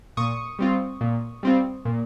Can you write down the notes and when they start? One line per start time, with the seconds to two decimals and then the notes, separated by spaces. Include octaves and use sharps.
0.17 A#2 C#6 D#6
0.59 G3 C4 F4
1.01 A#2
1.43 G3 C4 F4
1.85 A#2